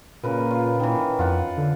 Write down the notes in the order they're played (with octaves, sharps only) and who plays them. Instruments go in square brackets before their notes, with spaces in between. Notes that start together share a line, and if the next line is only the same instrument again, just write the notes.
[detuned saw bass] A#2 [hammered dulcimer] C#3 A#4 B4
[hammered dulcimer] F4
D#3 E3
[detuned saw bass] F2 [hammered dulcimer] F4 F#5 A5
[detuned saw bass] D3